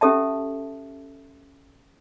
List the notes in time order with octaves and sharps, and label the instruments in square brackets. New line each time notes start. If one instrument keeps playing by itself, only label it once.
[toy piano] C#4 G4 A4 E5 A5